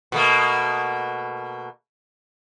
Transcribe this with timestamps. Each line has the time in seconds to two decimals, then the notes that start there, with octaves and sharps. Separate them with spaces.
0.12 B2 A3 A#3